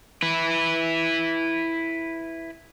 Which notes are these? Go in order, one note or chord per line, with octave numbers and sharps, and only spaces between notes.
E4 B4